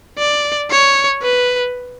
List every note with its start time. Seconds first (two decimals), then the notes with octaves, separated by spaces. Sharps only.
0.18 D5
0.70 C#5
1.22 B4